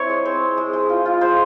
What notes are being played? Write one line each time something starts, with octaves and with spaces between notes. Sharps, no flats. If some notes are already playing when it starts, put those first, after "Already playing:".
Already playing: C4 E4 C#5
G#3
C4
G#3
G#3
G#3
F4
F4
G#3 C5